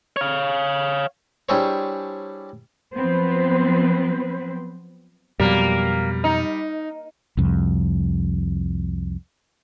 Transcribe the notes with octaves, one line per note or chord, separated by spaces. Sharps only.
C#5 F5
G3 D4 E4 G#4 C5 C#5
F3 F#3 B3 C4 B4 C5
F2 B2 F#3 G3 A#3
D#4
C2 F2